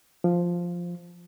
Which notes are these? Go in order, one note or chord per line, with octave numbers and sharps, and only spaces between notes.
F3